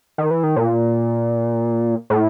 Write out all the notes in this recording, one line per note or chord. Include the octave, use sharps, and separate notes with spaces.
D#3
E3
D#3
A#2
A2